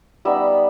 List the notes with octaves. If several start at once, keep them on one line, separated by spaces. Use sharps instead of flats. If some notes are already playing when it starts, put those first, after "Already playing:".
G3 B3 D#4 E5